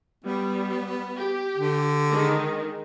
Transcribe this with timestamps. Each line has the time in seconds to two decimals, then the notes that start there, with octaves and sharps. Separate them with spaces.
0.24 G3 B3
1.15 G4
1.57 D3
2.11 D#3 G#3